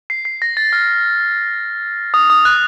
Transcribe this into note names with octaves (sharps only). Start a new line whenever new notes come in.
C7
C7
A#6
A6
F6
D#6
D#6
F#6